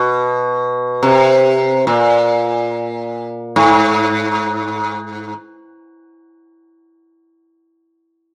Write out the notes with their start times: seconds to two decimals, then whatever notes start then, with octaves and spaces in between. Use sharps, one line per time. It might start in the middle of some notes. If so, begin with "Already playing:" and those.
Already playing: B2
1.03 C3
1.87 A#2
3.56 G#2